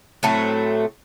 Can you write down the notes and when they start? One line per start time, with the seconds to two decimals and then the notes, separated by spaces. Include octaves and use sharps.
0.23 A2 F#3 A3 C4